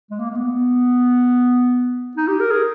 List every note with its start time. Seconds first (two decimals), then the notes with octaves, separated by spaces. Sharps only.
0.11 G#3
0.19 A#3
0.30 A#3
0.35 B3
2.17 D#4
2.28 G4
2.40 A#4
2.51 G#4